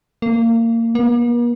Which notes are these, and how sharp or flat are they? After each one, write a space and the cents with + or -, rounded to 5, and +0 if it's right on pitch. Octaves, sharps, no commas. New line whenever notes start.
A#3 -25
A#3 +45